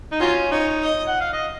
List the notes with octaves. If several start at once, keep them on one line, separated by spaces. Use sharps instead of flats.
D#4
F#3 C#4 F4
D#4 C#5
D#5
F#5
F5
D#5